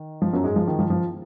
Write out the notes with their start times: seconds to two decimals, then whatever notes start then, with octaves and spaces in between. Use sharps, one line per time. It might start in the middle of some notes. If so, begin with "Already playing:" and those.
Already playing: D#3
0.22 F3
0.33 F#2 F#3
0.44 G#2 G#3
0.56 F3
0.67 D#3
0.79 F3
0.90 F3